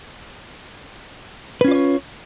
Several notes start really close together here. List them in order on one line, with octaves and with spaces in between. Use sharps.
B4 C#4 F4 D5 C#5